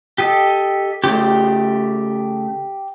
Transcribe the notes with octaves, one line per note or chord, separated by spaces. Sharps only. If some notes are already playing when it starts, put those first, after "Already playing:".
G4 A4 D#5
C#3 A3 G4 G6